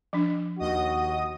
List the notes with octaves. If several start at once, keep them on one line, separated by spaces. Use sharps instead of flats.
F3 D4
D#2 F#4 D#5 D#6